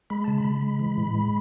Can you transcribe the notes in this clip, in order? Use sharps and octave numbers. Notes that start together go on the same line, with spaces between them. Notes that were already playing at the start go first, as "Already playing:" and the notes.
G#3 B5
C#3 A5
B5
C#3
G#3
E3
A2
G#3